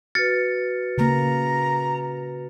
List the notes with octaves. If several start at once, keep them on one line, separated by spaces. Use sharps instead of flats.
F#4 B4 F6 A6 C#7
C#3 A#3 A#5